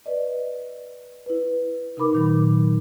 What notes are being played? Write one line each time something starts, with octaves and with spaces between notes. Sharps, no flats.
B4 D5 D#5
E4 B4
C3 D#4 A#4 B5 D6
A#2 D#3 F#3